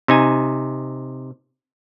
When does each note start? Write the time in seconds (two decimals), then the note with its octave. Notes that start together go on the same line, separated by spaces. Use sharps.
0.08 C3 D#4 G#5